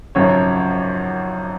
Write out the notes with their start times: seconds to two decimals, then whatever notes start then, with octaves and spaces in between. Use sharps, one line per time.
0.15 G#1 F#2 C#3 F3 C#5